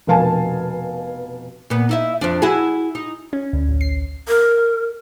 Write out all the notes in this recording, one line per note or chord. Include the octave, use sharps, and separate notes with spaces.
F1 B2 A#4 F5 G#5 A5
A#2 B3
D#4 E4 E5
F2 F3 D4
E4 F#4 G#4
D#4
C#4
D2
A1
C7
A#4